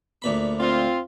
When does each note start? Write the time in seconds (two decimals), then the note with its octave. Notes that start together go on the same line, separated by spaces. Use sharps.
0.22 D2 A#2 B5
0.60 C4 F4